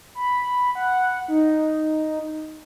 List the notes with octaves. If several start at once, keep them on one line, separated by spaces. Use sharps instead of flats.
B5
F#5
D#4